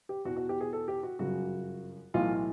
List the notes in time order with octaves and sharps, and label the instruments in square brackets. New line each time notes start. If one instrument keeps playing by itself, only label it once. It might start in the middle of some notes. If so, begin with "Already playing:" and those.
[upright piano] G4
E2 B2 F#4
F#4
G4
G#4
A4
G4
F#4
G1 F#2 C#3 F#4
B1 A2 E3 F4